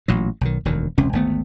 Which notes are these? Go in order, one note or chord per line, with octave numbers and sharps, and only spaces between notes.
A1 A#2 F#3
B1 D#3
E1 D2 D#3
E1 C#2 C3 C#4
G#1 D2 A3 B3